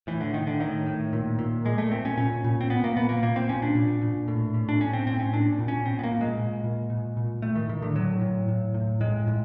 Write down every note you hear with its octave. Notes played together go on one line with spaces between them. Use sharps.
A2 E3
D3
A2 D#3
D3
A2 D#3
A2
A#2
A#2
A#2 G#3
A3
A#2 C4
C#4
A#2 C#4
A#2
C4
A#2 B3
A#3
A#2 B3
A#3
A#2 A#3
C4
A#2 C#4
D4
A#2
A#2
A2
A2
D4
A2 C#4
C4
A2 C4
C#4
A#2 D4
A#2
C#4
A#2 C4
B3
A#3
A#2
G#3
A#2
A#2
A#2
A#2
A2 A3
D#3
A2 D#3
D3
A2 F#3
A2
A2
A2
A2 G#3
A2